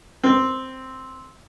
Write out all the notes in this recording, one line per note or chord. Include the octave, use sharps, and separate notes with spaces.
C4